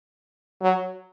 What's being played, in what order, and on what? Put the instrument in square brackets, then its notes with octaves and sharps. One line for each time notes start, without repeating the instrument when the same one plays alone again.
[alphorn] F#3